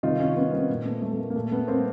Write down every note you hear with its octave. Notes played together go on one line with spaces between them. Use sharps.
C3 D#3 D#4 F4
C#4 D#4
B3 C#4
A#3 C4
A#2 A#3
A3 B3
A3
A3
A#3
A#3
A#2 A3
A3 B3
A#3 C4